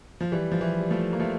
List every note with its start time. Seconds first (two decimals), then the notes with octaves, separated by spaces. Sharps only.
0.21 F3
0.32 E3 G3
0.52 F3
0.61 E3 G3
0.80 G3
0.91 F3 A3
1.12 A#3
1.20 F3 A3